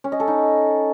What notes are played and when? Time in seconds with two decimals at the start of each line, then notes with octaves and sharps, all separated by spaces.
0.04 C#4
0.12 D#5
0.20 A4
0.28 D#4